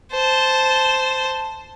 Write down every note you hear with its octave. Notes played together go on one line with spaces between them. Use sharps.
C5 A5